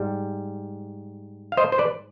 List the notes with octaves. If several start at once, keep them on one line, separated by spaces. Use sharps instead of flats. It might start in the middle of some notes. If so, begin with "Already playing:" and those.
Already playing: G#2 G3
F5
C5 D#5
C5
B4 D5